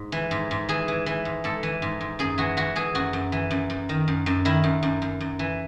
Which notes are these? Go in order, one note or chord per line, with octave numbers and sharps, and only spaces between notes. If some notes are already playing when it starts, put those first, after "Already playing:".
Already playing: G#2
E3
G#2
G#2
E3 G#4
E3
E3
G#2
G#2 A4
E3
G#2
G#2
F#2 G#4
E3 F#4
E3 F#4
E3 G#4
F#2 F#4
F#2
E3
F#2
F#2
D#3
F#2
F#2
D#3 E4
F#2
F#2
F#2
F#2
E3